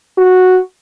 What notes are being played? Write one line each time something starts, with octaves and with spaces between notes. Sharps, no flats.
F#4